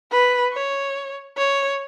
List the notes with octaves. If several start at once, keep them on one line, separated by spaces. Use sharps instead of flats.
B4
C#5
C#5